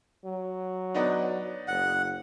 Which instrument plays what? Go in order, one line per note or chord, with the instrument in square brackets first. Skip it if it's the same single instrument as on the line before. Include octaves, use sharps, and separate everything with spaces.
[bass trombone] F#3
[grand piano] B3 D4 D#4
[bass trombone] F#1 [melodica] F#5